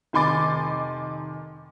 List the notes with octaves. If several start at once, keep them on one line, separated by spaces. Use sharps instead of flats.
F1 D#3 G#5 C6 D6 A6